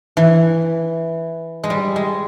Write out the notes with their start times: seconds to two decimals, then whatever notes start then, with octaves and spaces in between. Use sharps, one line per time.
0.17 E3
1.64 G#3
1.70 G3
1.96 G#3